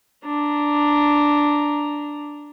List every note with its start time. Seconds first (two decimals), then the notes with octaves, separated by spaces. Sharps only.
0.24 D4 A#5